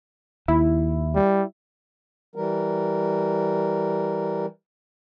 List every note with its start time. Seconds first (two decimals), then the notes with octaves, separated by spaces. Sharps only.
0.48 D#2 E4
1.15 G3
2.36 E3 G3 A#4